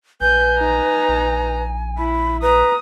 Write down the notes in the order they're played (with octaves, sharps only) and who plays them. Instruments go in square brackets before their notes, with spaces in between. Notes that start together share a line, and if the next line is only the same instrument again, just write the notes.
[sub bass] A#1 [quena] B4 [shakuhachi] G#5 [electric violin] G6
[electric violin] D#4 A#5
[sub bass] A#1
[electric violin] E4 [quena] B5
[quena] B4 [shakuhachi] A#5 [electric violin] D#6